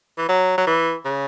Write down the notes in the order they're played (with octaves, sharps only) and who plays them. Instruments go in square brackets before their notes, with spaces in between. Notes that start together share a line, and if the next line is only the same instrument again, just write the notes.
[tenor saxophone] E3
F#3
F#3
E3
C#3